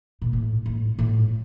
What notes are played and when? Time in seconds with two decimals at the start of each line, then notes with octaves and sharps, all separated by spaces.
0.22 A#2
0.33 A2
0.66 A2
0.99 A2